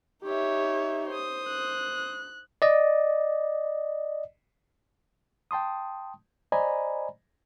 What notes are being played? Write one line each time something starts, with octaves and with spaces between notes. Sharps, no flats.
D#4 G4 C#5 E5
C5 D#6
F#6
D5 D#5
G5 A5 C6 D#6
C5 D5 D#5 G#5 A#5 B5